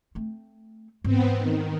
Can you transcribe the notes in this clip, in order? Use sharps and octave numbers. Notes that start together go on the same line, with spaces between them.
A3 C4
G#2 E3 B3 C4
D#3